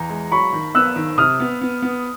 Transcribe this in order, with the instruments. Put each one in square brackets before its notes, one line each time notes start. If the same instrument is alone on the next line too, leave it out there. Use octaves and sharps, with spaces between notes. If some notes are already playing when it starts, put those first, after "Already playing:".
Already playing: [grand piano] E2 [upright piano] A#5
[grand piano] G#3
[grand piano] F#3 [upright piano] B5 C#6
[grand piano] D#3
[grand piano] B3 [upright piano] E6 F#6
[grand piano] D#3
[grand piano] C3 [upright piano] D#6 F6
[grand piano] B3
B3
B3